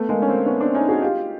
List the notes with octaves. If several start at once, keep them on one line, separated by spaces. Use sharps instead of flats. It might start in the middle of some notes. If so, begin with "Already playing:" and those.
Already playing: A3 B3
G#3 A#3
C#4
A#3 C4
B3 C#4
C4 D4
C#4 D#4
F#4 G#4
F4 G4